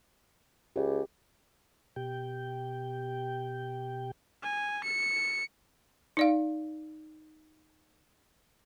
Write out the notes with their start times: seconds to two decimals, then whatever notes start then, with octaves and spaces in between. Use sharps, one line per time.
0.76 C#2 G4
1.96 B2 G4 G5
4.43 G#5
4.84 C#7
6.17 D#4 D5 F5